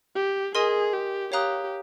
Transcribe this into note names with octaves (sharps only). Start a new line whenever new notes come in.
G4
G#4 A#4 D#5 G#5 C6 D#6
G4
G4 C#5 F5 A#5 D#6 F#6